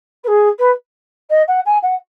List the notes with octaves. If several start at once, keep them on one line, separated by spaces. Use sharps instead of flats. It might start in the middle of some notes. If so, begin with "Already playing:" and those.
B4
G#4
B4
D#5
F#5
G#5
F#5